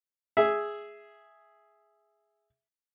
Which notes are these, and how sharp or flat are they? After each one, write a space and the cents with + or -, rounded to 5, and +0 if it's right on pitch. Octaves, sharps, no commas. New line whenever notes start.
G#4 +0 E5 +0